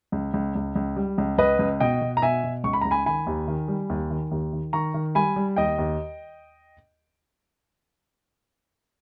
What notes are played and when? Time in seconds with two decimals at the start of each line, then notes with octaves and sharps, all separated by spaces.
0.12 C#2
0.34 C#2
0.55 C#2
0.75 C#2
0.96 G3
1.18 C#2
1.38 C#2 B4 D#5
1.59 C#2
1.80 B2 D#5 G5
2.01 B2
2.17 A#5
2.22 B2 E5 G#5
2.44 B2
2.64 C#2 C#6
2.73 B5
2.81 C#2 A#5
2.91 G#5 B5
3.06 D#3 G#5 B5
3.27 D#2
3.48 D#3
3.68 G3
3.90 D#2
4.11 D#3
4.31 D#2
4.53 D#3
4.73 D#3 A#5 C#6
4.94 D#3
5.15 G3 G#5 B5
5.36 G3
5.56 D#2 D#5 G5
5.78 D#2